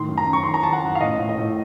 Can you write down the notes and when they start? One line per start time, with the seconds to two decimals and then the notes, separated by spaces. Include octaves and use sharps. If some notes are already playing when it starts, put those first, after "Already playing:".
Already playing: A2 D#3 C6
0.08 F#2
0.18 A#5
0.27 F#2
0.33 C#6
0.43 D#3 C6
0.54 A#5
0.63 D#3 A5
0.73 F#5
0.82 F#2
0.95 F5
1.01 A2 D#5
1.19 A2
1.29 D#5
1.38 A2